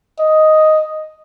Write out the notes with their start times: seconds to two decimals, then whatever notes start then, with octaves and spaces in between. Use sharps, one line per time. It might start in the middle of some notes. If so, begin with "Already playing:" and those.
0.19 D#5